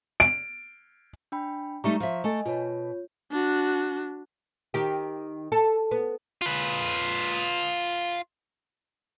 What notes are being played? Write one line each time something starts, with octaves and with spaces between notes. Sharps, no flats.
D7
D4 G5 B5
G3 A3 D#4 A#5 C#6
F3 E5
A3 A4 D#5 G#5
B2 F4 C#5
D4 F#4
D#3 G4
A4
B3
F4 B4